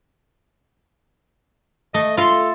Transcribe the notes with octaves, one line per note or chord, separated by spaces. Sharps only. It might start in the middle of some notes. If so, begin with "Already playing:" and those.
A3 D#5
F4 A4 C6